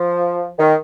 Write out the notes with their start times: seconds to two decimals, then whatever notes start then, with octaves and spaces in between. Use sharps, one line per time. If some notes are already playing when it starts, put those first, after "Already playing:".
Already playing: F3
0.59 D#3